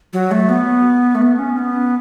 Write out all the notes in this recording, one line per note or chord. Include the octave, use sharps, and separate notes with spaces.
F#3
A3
B3
A3
B3
C#4
B3